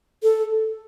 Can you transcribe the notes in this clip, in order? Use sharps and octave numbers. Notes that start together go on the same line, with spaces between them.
A4